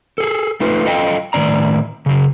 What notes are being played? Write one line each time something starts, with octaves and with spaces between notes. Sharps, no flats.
G#4 A4
A3 D#4 F4 B4
F4 A4 D#5 F5 G5
A2 D#3 C4 D5 A#5
C#3 F#3